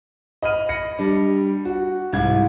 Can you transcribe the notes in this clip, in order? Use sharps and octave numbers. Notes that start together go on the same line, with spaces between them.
D#5 B5 F6 D#7
B5 A#6 C#7
G3 D4
F#4
C2 G#2 E4 G#6